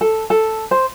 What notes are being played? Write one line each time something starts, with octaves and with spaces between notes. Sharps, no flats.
A4
A4
C5